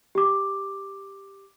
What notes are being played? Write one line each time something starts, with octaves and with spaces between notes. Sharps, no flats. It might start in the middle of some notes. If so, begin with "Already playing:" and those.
G4 D6